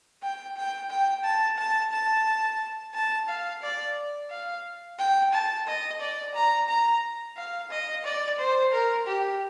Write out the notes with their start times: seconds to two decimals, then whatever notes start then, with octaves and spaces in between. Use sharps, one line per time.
0.22 G5
0.56 G5
0.90 G5
1.24 A5
1.58 A5
1.92 A5
2.94 A5
3.28 F5
3.62 D5
4.30 F5
4.99 G5
5.33 A5
5.67 D#5
6.00 D5
6.35 A#5
6.69 A#5
7.37 F5
7.71 D#5
8.04 D5
8.39 C5
8.72 A#4
9.06 G4